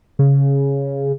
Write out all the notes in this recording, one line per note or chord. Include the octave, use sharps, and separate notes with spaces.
C#3